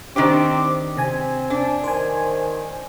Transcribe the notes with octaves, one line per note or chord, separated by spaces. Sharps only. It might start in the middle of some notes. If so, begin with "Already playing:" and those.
D#3 C4 D4 G4 D6
C3 C4 G#5
D4
D#3 C5 G#5